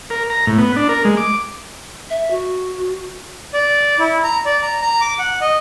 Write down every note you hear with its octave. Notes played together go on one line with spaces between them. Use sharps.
A#4
A#5
A2
B3
D4
A#4
G#3
D6
E5
F#4
D5
E4
A#5
D5
A#5
A#5
D6
F#5
D#5